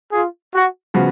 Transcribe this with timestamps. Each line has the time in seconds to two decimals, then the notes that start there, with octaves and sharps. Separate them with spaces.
0.12 F4 G#4
0.53 F#4
0.94 C#3 F3 B3 F#4 B4